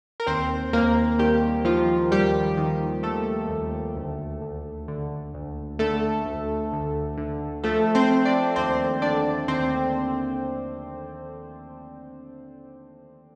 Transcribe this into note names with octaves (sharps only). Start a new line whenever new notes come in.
A#4
D#2 C4 C5
D#2 A#3 A#4
D#3 G3 G4
D#3 F3 F4
D#2 G3 G4
D#3
D#3 A3 A4
D#2
D2
D2
D3
D2
D3 A3 A4
D2
D2
D3
F3 A3 A4
C4 C5
F3
D4 D5
D#2 C4 C5
D3 D4 D5
D#2 C4 C5